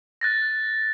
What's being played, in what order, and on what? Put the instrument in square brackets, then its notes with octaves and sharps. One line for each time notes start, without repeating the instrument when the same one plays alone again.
[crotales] F#6 A6 A#6